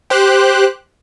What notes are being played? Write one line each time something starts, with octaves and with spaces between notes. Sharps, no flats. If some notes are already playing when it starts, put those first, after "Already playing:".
G4 C5 F#6